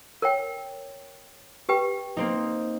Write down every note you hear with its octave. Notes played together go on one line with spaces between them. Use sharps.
A#4 C#5 G5
G4 B4 G5
A#3 C4 D#4